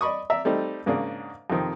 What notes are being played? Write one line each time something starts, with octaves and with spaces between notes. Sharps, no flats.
D5 D#5 B5 C#6 D#6
D5 E5 A#5
G3 A3 C4 D#4
G#2 C#3 A#3 D4
F2 C3 D#3 C4